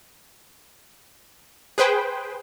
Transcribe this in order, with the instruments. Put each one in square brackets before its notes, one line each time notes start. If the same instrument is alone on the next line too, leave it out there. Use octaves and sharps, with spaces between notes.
[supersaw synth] G#4 B4 C5 G5